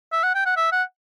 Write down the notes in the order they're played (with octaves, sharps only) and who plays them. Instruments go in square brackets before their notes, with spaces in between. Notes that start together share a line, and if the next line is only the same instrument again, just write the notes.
[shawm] E5
F#5
G5
F#5
E5
F#5